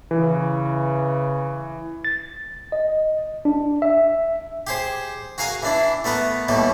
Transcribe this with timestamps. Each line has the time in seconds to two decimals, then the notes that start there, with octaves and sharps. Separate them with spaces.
0.11 C#3 E3
2.05 A6
2.72 D#5
3.45 D4
3.82 E5
4.67 G4 G#4 C5
5.38 F#4 G#4 A#4 F5 G#5 D#6
5.63 E3 D4 E4
6.04 A3 B3 A#4 B4
6.48 D#2 B2 E3 G3 A3